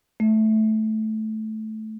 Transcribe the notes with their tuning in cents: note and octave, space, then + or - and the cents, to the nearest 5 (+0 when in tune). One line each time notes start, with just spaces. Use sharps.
A3 -10